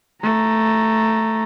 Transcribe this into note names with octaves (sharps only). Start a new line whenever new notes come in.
A3 A#5